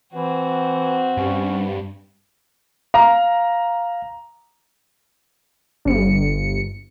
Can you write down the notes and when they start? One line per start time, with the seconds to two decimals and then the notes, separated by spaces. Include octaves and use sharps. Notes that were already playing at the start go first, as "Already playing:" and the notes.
0.14 E3 C4 F#4
1.17 G2 C#4
2.94 F5 A#5
5.85 G1 C#7